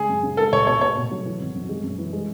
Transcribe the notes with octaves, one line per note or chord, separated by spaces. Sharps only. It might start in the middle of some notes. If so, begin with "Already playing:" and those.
Already playing: C#3 G#3 G#4
F#2
C#3
G#3 A4
C#2 C#5
B2 C#5
A3 C#5
B2
F#3
E3
G#1
F#2
G#3
F#2
E3
G#3